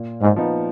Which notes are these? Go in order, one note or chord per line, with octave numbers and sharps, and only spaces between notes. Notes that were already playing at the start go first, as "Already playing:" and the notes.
Already playing: A#2
G#2
F3 B3 D#4